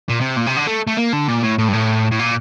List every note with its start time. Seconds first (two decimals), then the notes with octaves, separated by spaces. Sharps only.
0.09 A#2
0.21 C3
0.36 A#2
0.46 C3
0.56 D3
0.67 A3
0.87 A3
0.97 A#3
1.13 D3
1.28 A#2
1.43 A2
1.58 A2
1.68 G2
1.73 A2
2.12 A2
2.19 A#2